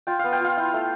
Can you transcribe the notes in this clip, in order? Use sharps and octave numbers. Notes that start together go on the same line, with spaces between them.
F4 G5
B3 F5
G5
F4 F5
E4
A3